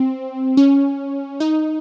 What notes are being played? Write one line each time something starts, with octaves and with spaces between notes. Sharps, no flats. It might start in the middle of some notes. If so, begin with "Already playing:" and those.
Already playing: C4
C#4
D#4